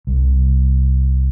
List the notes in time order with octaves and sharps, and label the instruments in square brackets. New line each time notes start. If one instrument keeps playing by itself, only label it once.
[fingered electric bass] C2